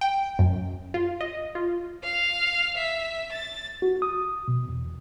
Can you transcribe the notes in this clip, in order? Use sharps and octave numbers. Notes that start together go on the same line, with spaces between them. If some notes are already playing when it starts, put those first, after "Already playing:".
G5
F#2
F4
D#5
F4
F5
E5
A6
F#4
D#6
B2
E2